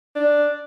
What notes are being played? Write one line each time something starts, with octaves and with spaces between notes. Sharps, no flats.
D4